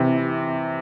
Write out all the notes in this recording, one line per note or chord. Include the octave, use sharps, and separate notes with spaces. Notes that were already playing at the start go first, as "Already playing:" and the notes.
Already playing: C3 E3